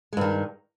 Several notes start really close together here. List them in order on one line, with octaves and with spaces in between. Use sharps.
G#3 G2 D#3